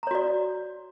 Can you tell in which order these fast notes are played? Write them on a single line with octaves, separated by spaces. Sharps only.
A#5 C#5 F#4 D5